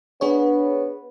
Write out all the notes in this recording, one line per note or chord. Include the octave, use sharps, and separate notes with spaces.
B3 D4 G#4 C#5